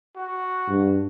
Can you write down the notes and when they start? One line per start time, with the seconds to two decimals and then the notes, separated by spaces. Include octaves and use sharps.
0.16 F#4
0.68 G2